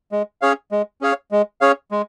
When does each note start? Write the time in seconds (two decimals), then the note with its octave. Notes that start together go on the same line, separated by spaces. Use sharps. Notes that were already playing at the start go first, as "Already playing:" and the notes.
0.12 G#3
0.42 C#4 G#4 C#5 F5
0.72 G#3
1.01 C#4 G#4 C#5 F5
1.32 G#3
1.61 C#4 G#4 C#5 F5
1.91 G#3